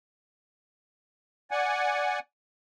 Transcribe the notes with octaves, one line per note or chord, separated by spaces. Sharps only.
D5 F#5 G#5